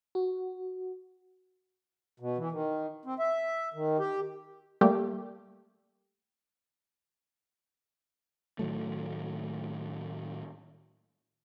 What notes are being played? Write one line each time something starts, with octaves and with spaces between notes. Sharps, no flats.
F#4
B2
E3
D#3
C4
E5
D#3
G4
G3 A3 A#3 G4
A2 D#3 F#3 A3